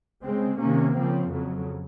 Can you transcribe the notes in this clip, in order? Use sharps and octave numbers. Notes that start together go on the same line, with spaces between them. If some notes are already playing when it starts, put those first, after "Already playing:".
C#3 G#3 C4
C3 D#3 A#3 C#4
C#3 F3 C4
F2 C#3 F#3